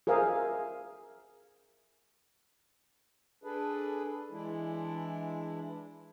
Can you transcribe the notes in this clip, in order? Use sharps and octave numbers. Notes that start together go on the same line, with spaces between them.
G#4 A#4 C5 E5 F5
D4 G#4 A4 B4
E3 G#3 D4 E4